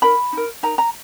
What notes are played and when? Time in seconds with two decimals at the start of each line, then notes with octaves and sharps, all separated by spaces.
0.02 D#4 A#4 B5
0.33 D#4 A#4
0.63 D#4 A#4 A#5
0.78 A#5